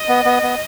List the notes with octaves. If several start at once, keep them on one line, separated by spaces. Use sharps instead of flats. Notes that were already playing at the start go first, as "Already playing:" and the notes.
Already playing: D#5
B3
B3
B3